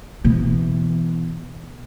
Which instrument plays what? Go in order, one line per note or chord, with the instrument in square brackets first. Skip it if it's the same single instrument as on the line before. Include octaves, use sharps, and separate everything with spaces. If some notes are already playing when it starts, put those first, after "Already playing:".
[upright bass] B2 E3